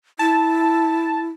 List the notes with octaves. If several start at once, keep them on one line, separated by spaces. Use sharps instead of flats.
E4 A5